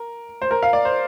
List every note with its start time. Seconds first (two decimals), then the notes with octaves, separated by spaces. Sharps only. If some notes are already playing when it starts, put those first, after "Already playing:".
Already playing: A#4
0.42 C5
0.51 A#4
0.63 F5
0.73 D5
0.85 C5